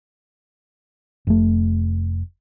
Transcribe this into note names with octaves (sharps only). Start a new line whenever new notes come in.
F1 A3